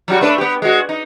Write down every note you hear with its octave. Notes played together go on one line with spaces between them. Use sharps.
F#3 G3 F#4
A3 D4 B4
B3 G4
G#3 F#4
D#4